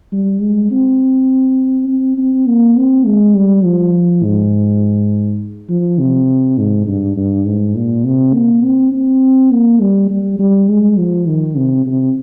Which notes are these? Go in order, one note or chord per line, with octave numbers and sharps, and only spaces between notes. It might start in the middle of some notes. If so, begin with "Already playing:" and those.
G3
G#3
C4
C4
C4
A#3
C4
G#3
G3
F3
G#2
F3
C3
G#2
G2
G2
G#2
A#2
C3
A#3
C4
C4
A#3
G3
G3
G3
G#3
F3
D#3
C3
C3